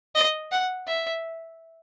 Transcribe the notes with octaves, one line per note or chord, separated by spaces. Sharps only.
D#5
F#5
E5